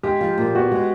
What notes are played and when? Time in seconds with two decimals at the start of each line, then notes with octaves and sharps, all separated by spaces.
0.03 G#3 G4
0.21 F3
0.38 A#2
0.55 B3 F#4
0.72 G#3